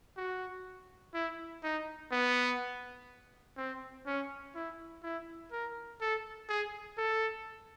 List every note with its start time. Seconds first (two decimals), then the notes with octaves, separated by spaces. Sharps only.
0.17 F#4
1.14 E4
1.63 D#4
2.12 B3
3.57 C4
4.06 C#4
4.55 E4
5.03 E4
5.52 A#4
6.01 A4
6.49 G#4
6.98 A4